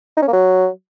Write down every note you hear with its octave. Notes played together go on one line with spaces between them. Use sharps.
D#4
C#4
A#3
F#3